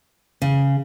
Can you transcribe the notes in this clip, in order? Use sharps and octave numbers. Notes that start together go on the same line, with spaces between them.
C#3